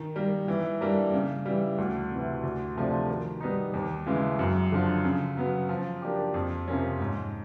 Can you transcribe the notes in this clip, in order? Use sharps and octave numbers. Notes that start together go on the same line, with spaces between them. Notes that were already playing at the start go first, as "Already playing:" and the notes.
Already playing: D#3
G3 A#3
E3
G3 A#3 D4
C#3
E3 G3
D2
C3 E3
D2
C3 F3 A3 D4
D#3
G3 B3 D#4
D#2
C#3 E3 G#3
F#2
D3 F3
C#3
F#3 B3
F3
A#3 D4 G4
F2
C3 F3 A#3 C#4
G#2